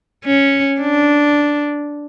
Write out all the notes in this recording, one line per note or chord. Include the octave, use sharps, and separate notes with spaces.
C#4
D4